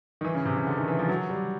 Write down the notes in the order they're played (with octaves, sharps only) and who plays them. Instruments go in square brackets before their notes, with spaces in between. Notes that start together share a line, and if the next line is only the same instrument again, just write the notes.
[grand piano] D#3
E3
C#3
C3
C#3
D3
D#3
E3
F3
F#3
G3